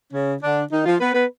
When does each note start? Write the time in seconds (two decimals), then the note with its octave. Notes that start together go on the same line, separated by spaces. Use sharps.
0.13 C#3 C#4
0.42 D3 D4
0.71 D#3 D#4
0.85 F3 F4
0.99 B3 B4
1.14 B3 B4